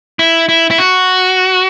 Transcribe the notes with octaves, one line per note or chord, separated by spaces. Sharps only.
E4
E4
E4
F#4